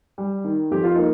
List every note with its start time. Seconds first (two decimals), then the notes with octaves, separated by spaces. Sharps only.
0.18 G3
0.44 D#3
0.71 F2 G4
0.83 F4
0.95 A#3 D#4